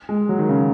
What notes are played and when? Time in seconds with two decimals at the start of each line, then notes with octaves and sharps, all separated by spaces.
0.09 G#3
0.29 F#3
0.39 D#3
0.49 C#3